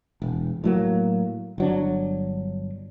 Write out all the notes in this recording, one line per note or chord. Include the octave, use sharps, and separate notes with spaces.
E1
A2 F#3 A#3
G1 F#3 D4